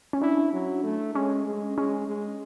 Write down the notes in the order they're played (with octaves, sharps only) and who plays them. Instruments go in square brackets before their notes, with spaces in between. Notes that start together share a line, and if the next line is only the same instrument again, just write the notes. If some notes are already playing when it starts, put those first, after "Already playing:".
[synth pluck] C#4
[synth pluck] D4 [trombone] E4
[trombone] F#3
A3
[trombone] G#3 [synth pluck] C#4
[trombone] G#3
[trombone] G#3 [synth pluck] C#4
[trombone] G#3